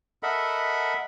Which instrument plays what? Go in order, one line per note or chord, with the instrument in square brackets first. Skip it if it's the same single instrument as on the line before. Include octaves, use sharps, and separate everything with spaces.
[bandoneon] A4 A#4 D#5 E5 F#5 B5